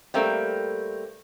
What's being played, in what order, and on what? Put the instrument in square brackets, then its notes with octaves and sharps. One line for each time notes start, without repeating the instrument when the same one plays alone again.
[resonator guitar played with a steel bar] G3 A3 A#3 C4